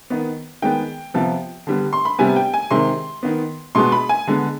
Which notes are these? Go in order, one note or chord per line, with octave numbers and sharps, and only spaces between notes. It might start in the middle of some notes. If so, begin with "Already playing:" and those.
D#3 B3
D#3 G#3 B3 G5
C3 F3 B3
D3 G3 B3
C6
B5
C3 G3 B3 G#5
G5
G#5
C3 D#3 G#3 C6
D#3 B3
B2 G#3 B3 C6
B5
G#5
D3 G#3 B3